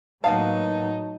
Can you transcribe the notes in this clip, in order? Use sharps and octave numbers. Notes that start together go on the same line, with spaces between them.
A2 F#3 A#3 B3 D#4 F5 A5